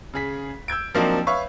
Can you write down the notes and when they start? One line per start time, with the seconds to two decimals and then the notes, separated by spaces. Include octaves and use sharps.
0.14 C#3 G#4 B6
0.68 E6 G6 G#6 D7
0.95 F3 F#3 A#3 C4 D4 D#4
1.27 B4 C#5 E5 F5 C#6